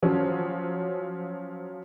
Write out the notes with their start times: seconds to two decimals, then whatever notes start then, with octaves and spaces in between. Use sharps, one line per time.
0.02 F3 F#3 C#4